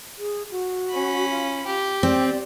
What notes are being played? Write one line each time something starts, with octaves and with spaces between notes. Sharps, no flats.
G#4
F#4
C#4 B5
F4
G4
C4 D5